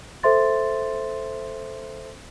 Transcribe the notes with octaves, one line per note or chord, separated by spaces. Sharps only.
A4 C5 E5 C6 A6